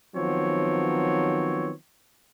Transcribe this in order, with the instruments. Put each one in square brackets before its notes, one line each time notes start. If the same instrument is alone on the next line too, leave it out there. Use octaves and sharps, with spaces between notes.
[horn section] D#3 F3 F#3 B3 C4 C#5